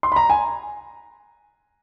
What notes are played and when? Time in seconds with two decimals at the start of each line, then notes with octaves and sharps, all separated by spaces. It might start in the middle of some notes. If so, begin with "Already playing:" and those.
0.03 C6
0.12 B5
0.16 A#5
0.30 G#5